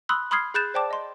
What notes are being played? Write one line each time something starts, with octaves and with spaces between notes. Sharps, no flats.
B5 C6 D#6 E6 F#6
B5 C6 D#6 F6 G#6 C7
G#4 B5 F#6 G6 A6 E7
C5 D5 G5 A5 D6
D#5 C6